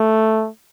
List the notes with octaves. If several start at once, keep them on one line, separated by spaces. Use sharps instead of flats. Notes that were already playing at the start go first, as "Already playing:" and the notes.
Already playing: A3